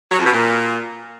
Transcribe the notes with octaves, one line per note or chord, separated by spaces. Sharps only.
F#3
F2
B2
A#2